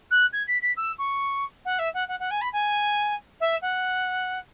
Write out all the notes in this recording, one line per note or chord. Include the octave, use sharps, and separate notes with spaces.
F#6
G#6
B6
B6
E6
C#6
F#5
E5
F#5
F#5
F#5
G#5
B5
G#5
E5
F#5